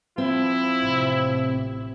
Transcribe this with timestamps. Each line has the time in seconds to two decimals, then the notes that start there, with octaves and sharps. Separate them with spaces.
0.18 F3 C4 E4
0.81 A1 C3